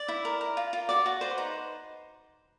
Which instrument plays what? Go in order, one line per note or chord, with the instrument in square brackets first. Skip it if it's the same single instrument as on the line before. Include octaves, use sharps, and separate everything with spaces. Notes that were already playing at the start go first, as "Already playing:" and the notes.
Already playing: [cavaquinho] D5 D6
E4
A#4
A#4
F4
F4
F#4 D5 D6
F#4
B4 C5 C6
D#4